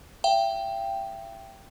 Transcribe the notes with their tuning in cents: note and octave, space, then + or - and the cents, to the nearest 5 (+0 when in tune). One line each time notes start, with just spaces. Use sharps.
E5 +40 G5 +0